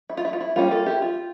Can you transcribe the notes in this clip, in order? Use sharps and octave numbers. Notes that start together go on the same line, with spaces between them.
E4
F4
E4
F4
E4
G3 A#3 C#4 F4
F4 A4
E4 G4
F4